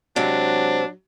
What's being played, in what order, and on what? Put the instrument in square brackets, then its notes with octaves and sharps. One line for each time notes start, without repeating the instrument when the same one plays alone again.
[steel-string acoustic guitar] C3 G#3 C4 [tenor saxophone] F#3 [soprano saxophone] D4